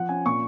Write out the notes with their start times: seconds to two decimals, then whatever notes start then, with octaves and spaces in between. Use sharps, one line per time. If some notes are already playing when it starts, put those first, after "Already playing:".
Already playing: F3 F#5
0.09 C#4 G#5
0.26 A#2 C#6